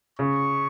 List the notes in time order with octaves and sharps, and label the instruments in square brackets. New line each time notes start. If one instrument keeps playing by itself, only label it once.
[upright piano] C#3 [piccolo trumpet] C#6